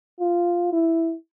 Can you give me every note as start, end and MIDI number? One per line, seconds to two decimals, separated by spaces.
0.20 0.70 65
0.72 1.14 64